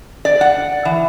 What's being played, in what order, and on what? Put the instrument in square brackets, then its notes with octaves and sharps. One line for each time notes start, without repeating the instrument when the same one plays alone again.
[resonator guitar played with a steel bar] D5
F#5
E3